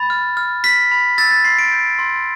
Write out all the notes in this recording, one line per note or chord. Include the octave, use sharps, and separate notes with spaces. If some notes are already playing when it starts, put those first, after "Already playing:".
Already playing: B5 A6
F6
F6
F6 B6
B5
E6 A6
A6
C6 C7
D7
G6
C6